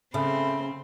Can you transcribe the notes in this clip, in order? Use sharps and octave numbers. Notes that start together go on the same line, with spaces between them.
C#3 A3 C4 B5